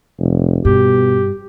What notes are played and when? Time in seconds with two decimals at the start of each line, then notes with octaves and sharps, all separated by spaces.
0.19 F1
0.65 G2 B2 G4